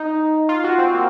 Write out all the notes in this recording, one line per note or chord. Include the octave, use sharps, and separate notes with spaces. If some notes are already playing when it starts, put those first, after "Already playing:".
Already playing: D#4
F4
F#4
C4
A#3